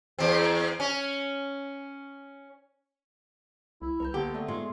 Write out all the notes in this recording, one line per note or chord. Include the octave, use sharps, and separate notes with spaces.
E2 C4
C#4
C2 E4
C2 B4 A#5 G6
D3 A#3 B3 G4
A3 A4 D5 E5
G#2 G#3 B3 F4